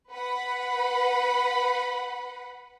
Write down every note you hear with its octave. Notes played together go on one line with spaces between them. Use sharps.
B4 F#5 B5